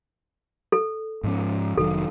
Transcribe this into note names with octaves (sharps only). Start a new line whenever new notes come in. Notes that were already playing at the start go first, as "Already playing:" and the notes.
A4
G#2 F3 C#4
F1 D#3 F#3 A4